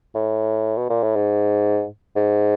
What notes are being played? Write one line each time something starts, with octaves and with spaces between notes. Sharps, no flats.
A2
B2
A#2
A2
G#2
G#2